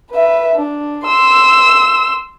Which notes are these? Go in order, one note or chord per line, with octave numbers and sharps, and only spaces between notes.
B4 E5
D4
C6 E6